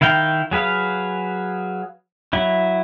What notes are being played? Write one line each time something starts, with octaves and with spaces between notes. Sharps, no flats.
D#3 E4 F5 G5
F#3 G#4 B4 F5
F#3 E4